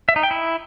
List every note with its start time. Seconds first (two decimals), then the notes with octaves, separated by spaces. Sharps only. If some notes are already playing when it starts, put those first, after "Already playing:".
0.09 E5
0.16 D#4
0.23 G5
0.31 E4